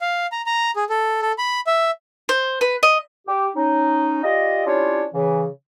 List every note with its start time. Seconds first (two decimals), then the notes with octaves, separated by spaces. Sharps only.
0.01 F5
0.32 A#5
0.46 A#5
0.76 G#4
0.90 A4
1.22 A4
1.38 B5
1.67 E5
2.29 C5
2.61 B4
2.83 D#5
3.27 G4
3.56 C#4 D#4
4.23 F4 G4 D5 D#5
4.66 C#4 D4 E4 F4 G4 C#5
5.14 C#3 E3